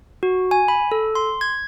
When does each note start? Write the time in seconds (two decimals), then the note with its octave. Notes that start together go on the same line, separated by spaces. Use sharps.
0.23 F#4
0.51 G#5
0.68 B5
0.92 A4
1.15 C6
1.41 G#6